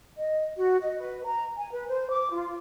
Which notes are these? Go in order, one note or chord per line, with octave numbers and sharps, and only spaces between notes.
D#5
F#4
D#5
B4
A#5
G#5
B4
C5
D6
F4